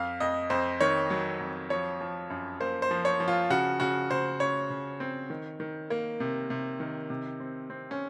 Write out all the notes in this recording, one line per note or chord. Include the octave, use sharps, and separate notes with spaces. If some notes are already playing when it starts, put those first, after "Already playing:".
Already playing: F2 F5
F2 D#5
F2 C5
D#3 C#5
F#3
F2
F3 C#5
F3
F#2
A#3 C5
C5
F3
C#5
F3
F4
C#3 F#4
C#3 F#4
C#3 C5
C#3 C#5
C#3
C4
D#3
D#3
A#3
C3
C3
D#3
C3
C4
C4
C#4